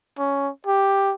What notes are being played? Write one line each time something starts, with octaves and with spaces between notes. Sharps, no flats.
C#4
G4